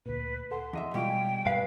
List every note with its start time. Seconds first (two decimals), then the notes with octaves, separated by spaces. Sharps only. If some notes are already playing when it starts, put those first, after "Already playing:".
0.06 D2 A#2 B4
0.51 A4 F#5 C6
0.73 E2 D#5 E5
0.94 B2 G3 G#3 F4 G5
1.10 G#5
1.46 G2 B4 F5